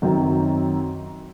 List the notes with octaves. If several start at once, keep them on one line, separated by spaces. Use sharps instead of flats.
F#2 D#3 F#3 C4